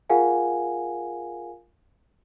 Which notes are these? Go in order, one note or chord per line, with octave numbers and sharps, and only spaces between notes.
F4 G#4 A#4 F5 F#5 G#5